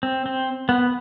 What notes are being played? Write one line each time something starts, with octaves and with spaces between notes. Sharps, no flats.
C4
C4
B3